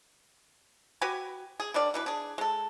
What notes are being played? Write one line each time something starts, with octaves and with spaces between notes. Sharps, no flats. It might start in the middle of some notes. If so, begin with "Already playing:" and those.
F#4 G4 B4 G#5
G#4
G3 D4 A#4 D5
B2 E3 B4
D4 G#4
G#3 A4